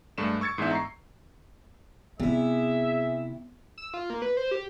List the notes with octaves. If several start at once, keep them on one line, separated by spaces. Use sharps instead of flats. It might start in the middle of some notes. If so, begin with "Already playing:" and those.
G2 G#3 A3 D4 E7
C#6 E6 G#6 A6 C#7
G#2 E3 G#3 B3 D4 E5
A#5 C#6 C7
C3 B3 C4 E4 G#4 E5
E6
F4
A#3
B4
C5
G4